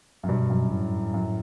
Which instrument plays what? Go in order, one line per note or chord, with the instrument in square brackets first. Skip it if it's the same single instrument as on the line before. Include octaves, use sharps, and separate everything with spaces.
[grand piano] F#2
[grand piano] G2 [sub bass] B2
[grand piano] F#2
[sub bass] A2
[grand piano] F#2